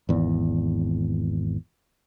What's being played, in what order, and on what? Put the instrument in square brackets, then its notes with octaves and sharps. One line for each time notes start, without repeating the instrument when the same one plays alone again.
[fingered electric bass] G#1 E2